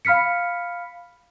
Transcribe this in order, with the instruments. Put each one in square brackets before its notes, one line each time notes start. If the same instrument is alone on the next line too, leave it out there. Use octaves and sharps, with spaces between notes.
[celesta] F5 B5 F6 B6 C#7